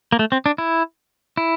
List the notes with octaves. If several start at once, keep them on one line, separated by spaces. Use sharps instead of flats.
A#3
A3
C4
D4
E4
E4